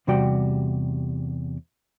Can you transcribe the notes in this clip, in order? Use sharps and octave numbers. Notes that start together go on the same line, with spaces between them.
E2 C3 G3 F#4 D5 G5